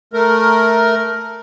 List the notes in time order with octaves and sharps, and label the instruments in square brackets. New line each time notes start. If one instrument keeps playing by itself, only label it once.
[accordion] A3 A#4